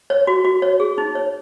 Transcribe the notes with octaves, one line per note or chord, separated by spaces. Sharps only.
C#5
F#4
F#4
C#5
G#4
D#4
C#5